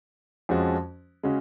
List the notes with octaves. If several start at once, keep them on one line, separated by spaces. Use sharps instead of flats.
F2 F3 G#3 C#4 F#4
C#3 G#3 C#4 F#4